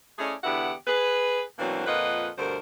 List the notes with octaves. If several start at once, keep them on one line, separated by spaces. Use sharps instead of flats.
A3 C#4 E4 G#4 D5 D#5
E2 D3 B3 E4 G4 F#5
G#4 B4
B2 E3 F#3 A#3 C4 D4
F2 A#2 F4 B4 D#5 F#5
D2 G2 B2 D3 A#4 C5